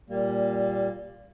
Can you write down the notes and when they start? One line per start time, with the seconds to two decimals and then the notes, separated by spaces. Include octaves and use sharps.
0.10 A#2 G3 A#3